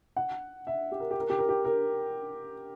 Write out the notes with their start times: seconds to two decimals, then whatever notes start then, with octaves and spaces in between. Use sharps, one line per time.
0.16 F#5
0.67 E5
0.92 G4
1.00 A#4
1.11 G4
1.20 A#4
1.30 G4
1.39 A#4
1.49 G4
1.65 A#4